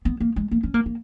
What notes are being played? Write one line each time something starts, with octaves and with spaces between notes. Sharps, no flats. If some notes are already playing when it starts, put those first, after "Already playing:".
B3
A#3
G#3
A#3
C#4
A#3
A#3